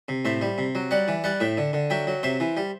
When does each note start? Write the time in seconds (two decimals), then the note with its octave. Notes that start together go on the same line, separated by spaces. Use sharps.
0.08 C3
0.25 A2 C5 E5
0.41 G3
0.58 C3
0.75 F#3
0.91 G3 D5 F#5
1.08 E3
1.24 G3 D5 F#5
1.40 A2 E5 G5
1.57 D3
1.73 D3
1.90 F#3 E5 G5
2.07 F#3
2.23 C3 C5 E5
2.40 E3
2.57 G3